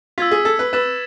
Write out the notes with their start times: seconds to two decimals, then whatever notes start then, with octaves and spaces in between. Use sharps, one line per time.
0.18 F4 E6 G#6 B6
0.31 G#4
0.45 A4
0.59 B4
0.73 B4 E6 A6 E7